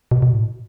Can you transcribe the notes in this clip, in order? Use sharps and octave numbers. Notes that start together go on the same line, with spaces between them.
B2
B2
A2